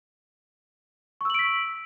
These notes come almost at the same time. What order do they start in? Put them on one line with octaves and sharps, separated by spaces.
C#6 E6 F#7 D7 B6